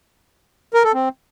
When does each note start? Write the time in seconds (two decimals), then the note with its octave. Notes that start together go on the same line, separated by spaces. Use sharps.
0.74 A#4
0.84 A4
0.94 C4